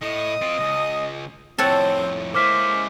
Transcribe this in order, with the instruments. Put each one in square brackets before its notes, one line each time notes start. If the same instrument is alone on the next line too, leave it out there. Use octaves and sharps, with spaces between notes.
[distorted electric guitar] A2 [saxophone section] D#5
[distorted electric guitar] C4 F4
C#2
[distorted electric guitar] F2 A2 [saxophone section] C4 [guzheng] A4 C#5 F#5
[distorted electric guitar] G#3 C#4 [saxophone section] A#3 E4 C5 [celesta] D6 F6 B6